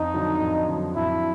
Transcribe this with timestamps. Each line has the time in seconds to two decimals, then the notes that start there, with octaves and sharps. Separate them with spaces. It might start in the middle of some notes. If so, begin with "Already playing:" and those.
Already playing: F2 D#4
0.14 D3 F#3
0.41 F2
0.68 D3 F#3
0.96 F2 E4